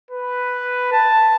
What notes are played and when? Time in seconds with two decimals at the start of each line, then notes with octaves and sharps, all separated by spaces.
0.11 B4
0.92 A5